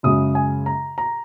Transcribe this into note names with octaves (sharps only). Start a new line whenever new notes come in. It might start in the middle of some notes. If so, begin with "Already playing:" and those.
F#2 C#3 G#3 D#6
G#5
A#5
A#5